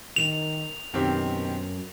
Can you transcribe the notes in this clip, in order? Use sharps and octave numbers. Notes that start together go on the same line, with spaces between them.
D#3 F7
F#2 B2 D#3 C4 G4